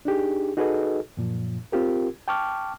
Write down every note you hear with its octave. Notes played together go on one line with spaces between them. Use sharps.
D4 D#4 G4 G#4
D#4 F#4 G#4 A4 B4 D#5
F#2 A#2 F3
C4 F4 G4 A#4
G5 A5 C#6 D6 F6